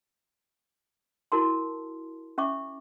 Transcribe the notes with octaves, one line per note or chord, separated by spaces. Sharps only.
E4 F#4 A#4 A5 A#5 C6
C#4 E5 C#6 D6